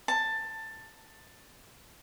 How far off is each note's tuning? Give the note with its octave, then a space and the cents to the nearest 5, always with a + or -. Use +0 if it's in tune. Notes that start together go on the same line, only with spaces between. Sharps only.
A5 +15